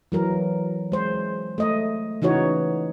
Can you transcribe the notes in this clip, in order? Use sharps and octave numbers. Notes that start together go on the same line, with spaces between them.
E3 F#3 A#4
G#3 C5
A3 D#5
C#3 E3 D#4 F#4 C#5